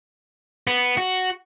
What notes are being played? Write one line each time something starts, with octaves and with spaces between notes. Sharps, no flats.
B3
F#4